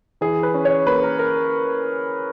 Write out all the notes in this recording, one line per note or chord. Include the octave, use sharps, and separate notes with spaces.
E3 G#4
B4
C#4
C#5
A#3 B4
A#4
A#4